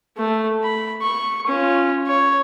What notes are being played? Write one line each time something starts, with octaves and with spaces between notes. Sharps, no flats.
A3
B5
C#6
C#4 F4
C#5